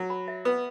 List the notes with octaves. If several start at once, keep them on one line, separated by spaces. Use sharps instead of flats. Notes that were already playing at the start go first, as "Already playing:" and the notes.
Already playing: F#3
B5
E5
B3 B4